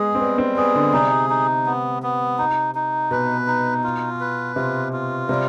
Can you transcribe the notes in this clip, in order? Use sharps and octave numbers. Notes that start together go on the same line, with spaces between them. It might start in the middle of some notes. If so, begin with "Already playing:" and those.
Already playing: G#3 B3 G#4
C4
G3 B3
C4
B3 G#4
D3
C3 D#4
D#4
B3
B3
D#4
D#4
B2 B4
D#4
F4
B4
C3 F4
F4
C3 G3